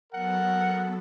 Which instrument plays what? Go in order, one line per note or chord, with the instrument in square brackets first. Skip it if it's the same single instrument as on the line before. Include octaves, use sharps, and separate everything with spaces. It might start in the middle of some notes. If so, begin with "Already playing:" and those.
[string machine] F#3 B3 A4 [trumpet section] A#4 F#5